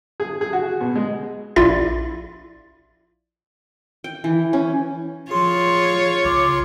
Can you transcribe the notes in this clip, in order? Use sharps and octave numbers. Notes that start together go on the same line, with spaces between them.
G#4
G#4
F#4
B2
G#3
A#1 E4 F4 D5 E5 A6
G5
E3
C#4
F3 F4 G#4 C#5 C6
C2 C#3 C6 D6